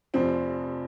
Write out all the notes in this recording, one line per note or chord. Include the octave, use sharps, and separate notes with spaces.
F1 F2 C3 F3 C4